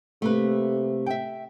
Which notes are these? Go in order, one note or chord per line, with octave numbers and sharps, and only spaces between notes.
C3 A3 A#3 B4
E5 G5